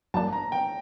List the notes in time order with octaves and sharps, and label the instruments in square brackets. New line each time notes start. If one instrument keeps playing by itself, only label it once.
[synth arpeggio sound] A1 G2 F#3 A#3 D4 [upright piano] A5
[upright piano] A#5
G5